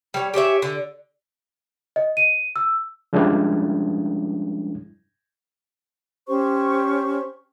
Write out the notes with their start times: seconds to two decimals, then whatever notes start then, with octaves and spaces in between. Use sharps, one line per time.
0.14 G3 C#5
0.34 G4 G#4 C#5 E5
0.62 D3
1.96 D#5
2.17 D#7
2.56 E6
3.13 F3 G3 G#3 C#4 D4 E4
6.27 C#4 G4 C5 C#6